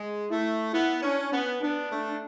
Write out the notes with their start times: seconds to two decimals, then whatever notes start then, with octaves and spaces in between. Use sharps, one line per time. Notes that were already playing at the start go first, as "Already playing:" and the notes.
Already playing: G#3
0.30 A3 E4
0.73 B3 E4
1.03 C#4 D4
1.33 B3 C#4
1.62 B3 D4
1.91 A3